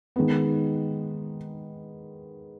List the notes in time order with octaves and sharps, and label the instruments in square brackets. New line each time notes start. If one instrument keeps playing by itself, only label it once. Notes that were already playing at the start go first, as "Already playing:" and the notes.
[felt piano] D#3 G#3 B3